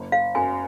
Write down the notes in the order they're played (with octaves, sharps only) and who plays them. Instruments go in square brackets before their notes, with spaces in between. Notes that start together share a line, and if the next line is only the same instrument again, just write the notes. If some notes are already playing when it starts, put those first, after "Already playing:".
Already playing: [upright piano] F#1
[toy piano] F5
[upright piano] F#2 [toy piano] G#5